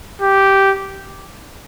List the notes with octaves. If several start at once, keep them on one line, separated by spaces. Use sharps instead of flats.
G4